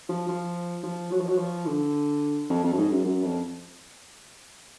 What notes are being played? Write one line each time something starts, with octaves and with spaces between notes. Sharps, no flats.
F3
F3
F3
F#3
F3
F#3
F3
D3
F2
F2
F#2
G#2
F#2
F#2
F2